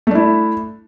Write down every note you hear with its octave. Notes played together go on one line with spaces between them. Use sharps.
A3 D4 E4